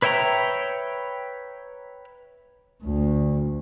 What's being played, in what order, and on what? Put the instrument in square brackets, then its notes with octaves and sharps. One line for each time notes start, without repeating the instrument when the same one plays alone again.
[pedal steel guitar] B4 C#5 E5 G5 A#5
[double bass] D2